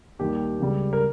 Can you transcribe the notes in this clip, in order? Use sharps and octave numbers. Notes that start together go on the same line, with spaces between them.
D#2 D#3 G3 G4
C#2 C#3 G3
A#4